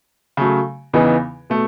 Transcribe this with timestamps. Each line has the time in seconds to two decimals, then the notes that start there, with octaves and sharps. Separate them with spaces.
0.37 C#3 F#3 A3
0.93 E2 C#3 E3 B3 D#4
1.50 B2 A3